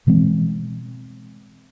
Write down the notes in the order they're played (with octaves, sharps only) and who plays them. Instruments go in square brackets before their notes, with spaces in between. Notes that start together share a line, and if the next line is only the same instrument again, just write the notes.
[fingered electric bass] B2 E3 G#3 C4